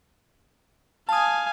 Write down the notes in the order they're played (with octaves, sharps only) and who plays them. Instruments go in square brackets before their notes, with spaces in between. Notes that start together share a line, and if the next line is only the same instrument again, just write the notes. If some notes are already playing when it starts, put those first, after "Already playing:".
[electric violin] F5 G#5 [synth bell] A5 D#6